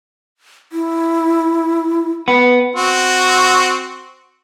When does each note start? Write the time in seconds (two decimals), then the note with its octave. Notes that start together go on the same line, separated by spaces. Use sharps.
0.72 E4
2.28 B3
2.76 C4 F#4